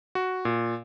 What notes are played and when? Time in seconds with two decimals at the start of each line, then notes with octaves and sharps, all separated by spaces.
0.15 F#4
0.45 A#2